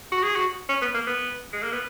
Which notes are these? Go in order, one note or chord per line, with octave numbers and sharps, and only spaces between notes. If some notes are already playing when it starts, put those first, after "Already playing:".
F#4
G#4
F#4
C#4
B3
A#3
B3
G#3
A#3
B3